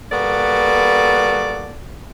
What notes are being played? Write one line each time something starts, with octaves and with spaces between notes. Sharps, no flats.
G3 A#3 B3 F#4 A4 D5